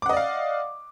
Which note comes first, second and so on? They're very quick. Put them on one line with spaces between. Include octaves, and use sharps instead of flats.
D6 F#5 D#5 D5 F5